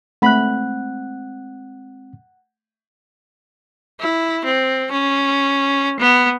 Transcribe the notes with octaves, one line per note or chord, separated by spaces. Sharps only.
G#3 A3 C4 F#5 B5 F#6
E4
C4
C#4
B3